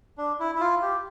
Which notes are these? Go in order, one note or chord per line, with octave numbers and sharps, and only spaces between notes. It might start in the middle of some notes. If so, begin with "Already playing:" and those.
D4
E4
E4
F4
G4